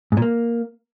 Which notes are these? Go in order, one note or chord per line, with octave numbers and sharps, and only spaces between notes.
G#2
A#2
A#3